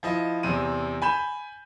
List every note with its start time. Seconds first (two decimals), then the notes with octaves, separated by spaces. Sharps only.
0.03 F3 E4 D#5
0.43 E2 C3 C4 D#7
1.02 G#5 B5 G6 E7